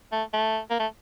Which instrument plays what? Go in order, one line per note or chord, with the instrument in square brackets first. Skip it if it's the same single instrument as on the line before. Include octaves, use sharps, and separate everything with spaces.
[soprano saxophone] A3
A3
A#3
A3